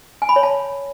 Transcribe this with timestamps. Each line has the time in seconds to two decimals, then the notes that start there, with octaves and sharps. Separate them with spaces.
0.22 G#5
0.29 B5
0.36 C#5
0.43 A5